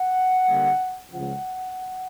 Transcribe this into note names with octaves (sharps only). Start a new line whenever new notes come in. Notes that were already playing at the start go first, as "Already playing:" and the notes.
Already playing: F#5
D3 G3 A#3
C#2 C#3 F3 F#5